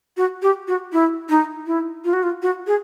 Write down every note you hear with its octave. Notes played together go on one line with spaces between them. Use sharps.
F#4
G4
F#4
E4
D#4
E4
F4
F#4
F4
F#4
G#4